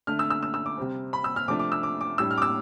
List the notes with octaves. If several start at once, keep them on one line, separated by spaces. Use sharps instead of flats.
D3 A3 D4 F6
E6
E6
E6
E6
D6
C3 G3 C4
B5
E6
F6
C3 F3 A3 D4 D6
D6
E6
D6
D6
A2 G3 D4 E6
F6
D6
E6